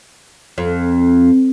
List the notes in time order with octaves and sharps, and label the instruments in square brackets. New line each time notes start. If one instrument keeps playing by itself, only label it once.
[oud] F2